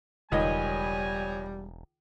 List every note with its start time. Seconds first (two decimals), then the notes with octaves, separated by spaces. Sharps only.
0.32 E1 C#2 D#3 G3 C#5 D#5 G#5